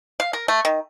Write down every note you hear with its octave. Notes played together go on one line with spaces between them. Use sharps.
F5
A#4
A3
D#3